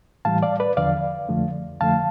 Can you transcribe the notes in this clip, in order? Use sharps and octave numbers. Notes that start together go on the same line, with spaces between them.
A2 E3 G3 F5 A5
D5 F5
B4 D5
E2 D3 F3 D5 F5
F2 D3 F3 A3
F2 D3 F3 A3 F5 A5